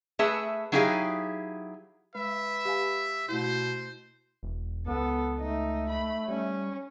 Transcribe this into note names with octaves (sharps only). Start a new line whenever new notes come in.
A3 G#4 B4 E5
F#3 D#4 E4 G4 G#4 F5
G#3 B4 E5
G4 F5 G#5
B2 A3 E4 C5
E1
C#2 B3 A4
A3 D#4
B5
G3 C#4